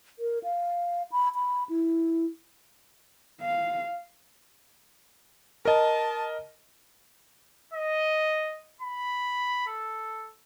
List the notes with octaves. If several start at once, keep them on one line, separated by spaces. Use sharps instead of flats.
A#4
F5
B5
B5
E4
F5
A#4 D#5 A5
D#5
B5
A4